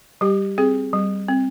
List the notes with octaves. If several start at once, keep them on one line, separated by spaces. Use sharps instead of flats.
G3 G4
C4 G#4
G3
C4